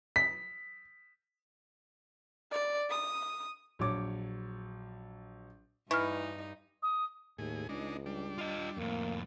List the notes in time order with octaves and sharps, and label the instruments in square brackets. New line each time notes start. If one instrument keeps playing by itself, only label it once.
[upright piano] B6
[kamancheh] D5
D#6
[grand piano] A#1 F#3 C#5 D6
[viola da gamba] G2 D#4 [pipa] E3 [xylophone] C#6 F6
[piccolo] D#6
[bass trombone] D#2 [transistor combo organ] A2 G#4
[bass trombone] C#2 [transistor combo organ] G#3 D4 D#4
[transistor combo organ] G3 D4
[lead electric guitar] F4 D#5
[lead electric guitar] F2 A2 [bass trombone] A#3